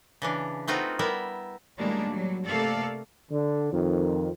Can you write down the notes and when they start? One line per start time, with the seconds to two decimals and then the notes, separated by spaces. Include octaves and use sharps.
0.22 C#3 E3 D4
0.68 A3 B3 C4 D#4 F4 F#4
0.99 G3 B3 E4 A#4 E5
1.78 A2 D#3 G3 G#3 A#3 D4
2.11 F#3 G3
2.46 C3 A3 A#3 A4 D5 F5
3.30 D3
3.72 F2 D#3